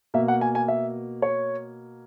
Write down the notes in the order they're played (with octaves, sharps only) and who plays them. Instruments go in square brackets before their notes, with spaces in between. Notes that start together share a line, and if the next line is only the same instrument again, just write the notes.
[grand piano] B2 A#3 E5
F#5
G#5
G#5
E5
C#5